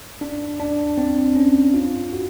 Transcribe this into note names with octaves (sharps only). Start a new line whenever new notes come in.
D4
D4
C4
C#4
F4
F#4